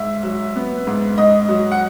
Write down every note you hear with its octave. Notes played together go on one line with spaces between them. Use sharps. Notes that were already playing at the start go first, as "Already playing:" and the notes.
Already playing: G#2 E5
F#3
B3
G#2
G#2 D#5
F#3
F#5